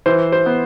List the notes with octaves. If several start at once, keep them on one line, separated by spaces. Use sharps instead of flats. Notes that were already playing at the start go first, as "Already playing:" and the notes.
E3 C5
C5
B3